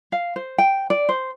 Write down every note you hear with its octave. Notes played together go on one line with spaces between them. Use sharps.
F5
C5
G5
D5
C5